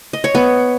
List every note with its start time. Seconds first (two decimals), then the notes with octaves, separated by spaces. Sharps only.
0.13 D#5
0.24 C#5
0.35 B3